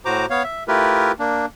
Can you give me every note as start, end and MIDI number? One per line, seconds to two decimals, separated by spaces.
0.05 0.26 45
0.05 0.26 66
0.05 0.26 72
0.05 0.26 82
0.05 0.26 86
0.30 0.43 59
0.30 0.43 73
0.30 0.43 77
0.43 0.64 76
0.68 1.12 57
0.68 1.12 64
0.68 1.12 65
0.68 1.12 67
0.68 1.12 70
0.68 1.12 71
1.19 1.46 58
1.19 1.46 62